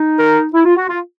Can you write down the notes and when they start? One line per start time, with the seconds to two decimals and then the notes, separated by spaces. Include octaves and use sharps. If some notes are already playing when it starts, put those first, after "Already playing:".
Already playing: D#4
0.19 A#4
0.54 E4
0.65 F4
0.76 F#4
0.88 F4